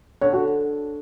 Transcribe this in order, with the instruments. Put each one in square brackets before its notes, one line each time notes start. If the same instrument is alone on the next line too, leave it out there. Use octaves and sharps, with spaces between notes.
[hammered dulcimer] D3 [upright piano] C#5
[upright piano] F#4